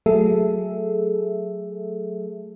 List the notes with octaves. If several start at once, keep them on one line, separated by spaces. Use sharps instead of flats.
F#3 A3 G#4 A4 E5